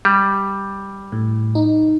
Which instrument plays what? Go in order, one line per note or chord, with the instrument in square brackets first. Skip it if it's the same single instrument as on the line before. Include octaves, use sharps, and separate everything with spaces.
[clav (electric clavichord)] G3
[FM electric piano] A2
D#4